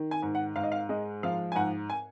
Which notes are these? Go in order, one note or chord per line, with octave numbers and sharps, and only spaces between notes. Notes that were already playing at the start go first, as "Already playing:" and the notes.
Already playing: D#3
G#5
G#2
F#5
G#2 F5
D#5
F5
G#3 D#5
F3 F5
G#5
G#2 F#5
G#5